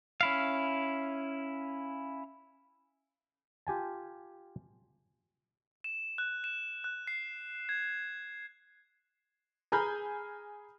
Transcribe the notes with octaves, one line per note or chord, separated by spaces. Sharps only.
C#4 E4 F5
F4 G4 G#5 A5
E7
F#6
E7
F#6
C7
G#6
G#4 G#5 A#5 B5 F6 G6